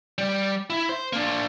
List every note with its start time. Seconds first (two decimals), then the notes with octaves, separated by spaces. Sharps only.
0.18 G3
0.70 E4
0.89 C5
1.13 A#3 D4